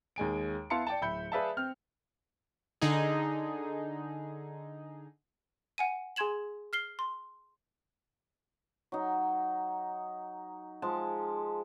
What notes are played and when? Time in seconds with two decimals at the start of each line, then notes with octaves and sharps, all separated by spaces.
0.16 D#2 G#3 G#5 D7
0.70 B3 E4 F5 A5 C6 C#7
0.87 D5 G5 A5
1.02 D1 E5 B5 G6 C#7
1.32 G#4 B4 D5 E5 F5 A5
1.57 C4 G5 F6
2.82 D3 D#4 G#4
5.78 F#5 G#5 D#7
6.16 G#4 G#5 C6 G#6 E7 F#7
6.73 F6 C7 G7
6.99 C6
8.92 F#3 D#4
10.82 F3 G#3 A5